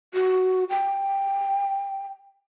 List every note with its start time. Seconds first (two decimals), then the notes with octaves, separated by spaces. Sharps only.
0.14 F#4
0.70 G5